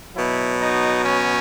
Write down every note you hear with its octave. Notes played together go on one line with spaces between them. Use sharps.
B2 F#3 E4
D#4
C#4